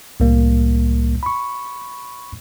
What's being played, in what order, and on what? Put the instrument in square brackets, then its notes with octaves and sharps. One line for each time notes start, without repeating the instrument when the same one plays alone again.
[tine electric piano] C2 A2 G3 A#3
B5 C#6